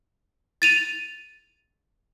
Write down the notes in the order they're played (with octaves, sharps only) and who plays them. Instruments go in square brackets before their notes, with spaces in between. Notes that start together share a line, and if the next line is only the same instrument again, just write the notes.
[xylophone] A6 D#7 F7